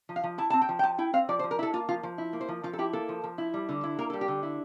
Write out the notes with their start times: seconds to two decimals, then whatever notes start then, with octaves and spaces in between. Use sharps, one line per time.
0.09 F3
0.16 F5
0.24 F3
0.38 E4 A5
0.50 C4 A5
0.62 G5
0.69 F3
0.79 G5
0.83 F3 A5
0.98 E4 G5
1.13 C4 F5
1.29 F3 D5
1.39 C5
1.44 F3
1.51 A#4
1.59 E4 A4
1.73 A#3 F4
1.88 F3 F4
2.03 F3
2.18 E4
2.33 A#3
2.41 C5
2.48 F3
2.63 F3 F4
2.73 A4
2.79 E4 G4
2.93 A#3 A4
3.09 F3
3.24 F3
3.38 E4
3.54 G3
3.69 D3
3.84 E4
3.99 A#3 A#4
4.10 A4
4.13 G3
4.21 G4
4.28 D3
4.43 E4